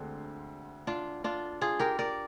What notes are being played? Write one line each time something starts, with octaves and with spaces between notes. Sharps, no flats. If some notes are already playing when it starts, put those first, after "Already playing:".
Already playing: D2 D3 G#3 C4 D4
D4 F4
D4 F4
F4 G#4
G4 A#4
A#4 D5